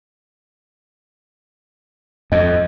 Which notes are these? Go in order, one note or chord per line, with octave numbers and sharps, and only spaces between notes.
F2 D#5